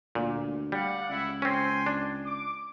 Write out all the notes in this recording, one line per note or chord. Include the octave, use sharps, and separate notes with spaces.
D2 A#2
G3 D5 F5 F#5
C#2 E4 E5 F#5
C4 C#4 G5 G#5 C6
D4
D6